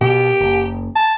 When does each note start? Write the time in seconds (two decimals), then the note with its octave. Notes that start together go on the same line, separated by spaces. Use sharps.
0.01 B2 B3 G4
0.40 F#1
0.96 A5